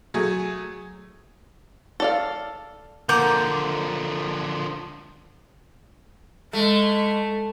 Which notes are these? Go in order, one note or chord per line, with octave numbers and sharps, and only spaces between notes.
F#3 A3 G#4
A4 D5 F5
D3 F3 A#3 F#5 D6 G6
G#3 A3